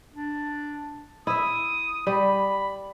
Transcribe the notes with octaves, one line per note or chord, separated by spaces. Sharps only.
D4
E4 E5 D#6
G3 B5